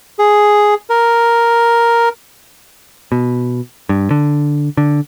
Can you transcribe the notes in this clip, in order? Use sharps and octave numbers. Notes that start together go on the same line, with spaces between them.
G#4
A#4
B2
G2
D3
D3